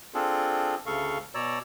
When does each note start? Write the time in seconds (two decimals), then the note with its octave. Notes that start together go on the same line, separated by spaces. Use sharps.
0.14 C4 D4 F4 G#4 A4
0.86 D2 C#3 A4 F5 C#6
1.35 B2 C#5 D5 A#5 E6